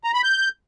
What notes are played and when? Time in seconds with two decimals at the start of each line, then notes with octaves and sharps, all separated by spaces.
0.04 A#5
0.14 B5
0.24 G6